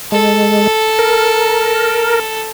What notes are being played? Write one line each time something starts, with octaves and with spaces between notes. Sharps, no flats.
G#3 A4
A#4